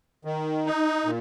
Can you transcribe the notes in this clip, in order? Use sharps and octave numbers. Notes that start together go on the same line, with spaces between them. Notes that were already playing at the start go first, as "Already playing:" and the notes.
D#3
D#4
A#2